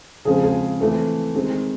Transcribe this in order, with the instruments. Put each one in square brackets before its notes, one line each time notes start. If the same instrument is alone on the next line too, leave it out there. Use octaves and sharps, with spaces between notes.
[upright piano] C#3 F3 G#3 C4 G#4
G#4
E3 A3 C4
D#3 G#3 C4